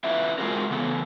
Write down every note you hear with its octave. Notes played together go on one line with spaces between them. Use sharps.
C#4 E4 F4 B4 D5 E5
G#3 C4 F4 F#4 G#4 A#4
C#3 E3 B3 A4